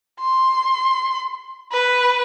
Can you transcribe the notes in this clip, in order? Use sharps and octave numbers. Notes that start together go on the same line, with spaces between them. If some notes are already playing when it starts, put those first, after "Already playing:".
C6
B4